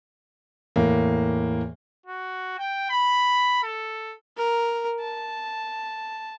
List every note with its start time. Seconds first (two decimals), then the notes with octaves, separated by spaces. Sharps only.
0.76 E2 A2 A#3
2.06 F#4
2.58 G5
2.90 B5
3.63 A4
4.37 A#4
5.00 A5